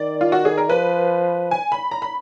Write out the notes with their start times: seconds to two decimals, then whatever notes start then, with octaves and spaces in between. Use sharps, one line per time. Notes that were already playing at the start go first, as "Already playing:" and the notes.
Already playing: D#3 D5
0.21 F4
0.32 F#4
0.45 G#4
0.58 A#4
0.70 F3 B4
1.51 G#5
1.72 B5
1.91 A#5
2.02 B5